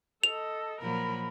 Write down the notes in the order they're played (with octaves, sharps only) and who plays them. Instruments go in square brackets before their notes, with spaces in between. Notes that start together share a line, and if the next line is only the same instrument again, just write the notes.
[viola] A4 D#5 [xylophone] F7
[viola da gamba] A#2 F3 F#3 [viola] A#4 B5